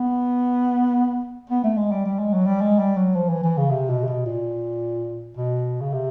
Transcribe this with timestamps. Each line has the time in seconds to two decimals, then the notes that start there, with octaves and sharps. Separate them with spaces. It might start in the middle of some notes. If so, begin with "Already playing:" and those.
Already playing: B3
1.50 B3
1.64 A3
1.78 G#3
1.91 G3
2.06 G3
2.19 G#3
2.33 F#3
2.46 G3
2.61 G#3
2.79 G3
2.97 F#3
3.15 F3
3.29 E3
3.44 E3
3.58 C#3
3.71 C3
3.90 B2
4.04 C3
4.08 B2
4.26 A#2
5.37 B2
5.81 C#3
5.93 C3